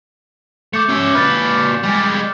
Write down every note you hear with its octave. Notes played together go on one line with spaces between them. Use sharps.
A3 D6 G6 C#7
C#4 E5
A#2 B4 F6 A6
G3 G#3